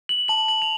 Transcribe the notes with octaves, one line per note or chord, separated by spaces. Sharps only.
F#7
A5 F#7
F#7
F7